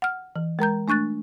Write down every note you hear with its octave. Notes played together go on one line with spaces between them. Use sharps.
F#5 F6
E3
G#3 A#4 A#5 G6
A3 D4 C#6 F#6 A6